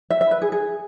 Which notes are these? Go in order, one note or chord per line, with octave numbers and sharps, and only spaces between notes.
E5
E5
B4
G#4
G#4